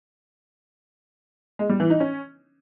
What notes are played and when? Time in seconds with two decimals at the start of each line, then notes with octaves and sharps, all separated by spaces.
1.59 G#3
1.69 G3
1.80 E3
1.90 D#4
2.00 C#4